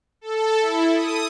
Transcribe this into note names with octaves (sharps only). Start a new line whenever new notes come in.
A4
E4
D#6